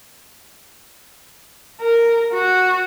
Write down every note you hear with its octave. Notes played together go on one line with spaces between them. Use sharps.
A#4
F#4